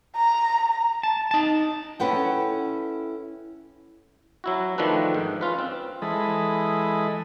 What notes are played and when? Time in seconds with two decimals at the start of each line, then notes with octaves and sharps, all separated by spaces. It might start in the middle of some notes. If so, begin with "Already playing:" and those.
0.15 A#5
1.03 A5
1.31 D#4 A5
2.00 C#4 E4 A4 B4 F#5 G5
4.44 F#3 E4 F#4
4.78 D#3 F3 A3 D4 B4
5.14 G#2
5.41 C#4 F4 B4
5.59 C4
6.02 E3 G#3 A4 D#5 B5